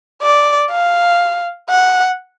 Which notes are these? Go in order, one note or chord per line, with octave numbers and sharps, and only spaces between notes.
D5
F5
F#5